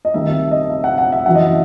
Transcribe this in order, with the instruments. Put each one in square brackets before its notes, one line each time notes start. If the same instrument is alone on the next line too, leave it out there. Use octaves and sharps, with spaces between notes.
[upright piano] D#5
C2 C3 D#3 E5
E5
D#5
E5
F#5
F#5
E5
F#2 E3 F#5
D#5
E5